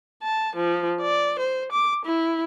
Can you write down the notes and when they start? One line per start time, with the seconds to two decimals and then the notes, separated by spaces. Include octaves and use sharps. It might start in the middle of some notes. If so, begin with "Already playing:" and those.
0.23 A5
0.56 F3
1.01 D5
1.39 C5
1.72 D6
2.05 E4